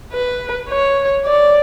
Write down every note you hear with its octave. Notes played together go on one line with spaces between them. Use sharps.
B4
C#5
D5